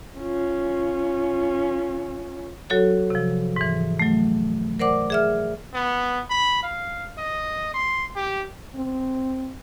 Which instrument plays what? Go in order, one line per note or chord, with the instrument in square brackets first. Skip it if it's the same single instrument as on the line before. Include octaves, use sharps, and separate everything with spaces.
[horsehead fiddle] C#4 F4
[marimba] F#3 F#4 A4 C#5
C3 F3
G#2 E3
F#3 A3
A#4 C5 D5 F#5 D6
G#4 E5 F6
[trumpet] B3
B5
F5
D#5
C6
G4
[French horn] C4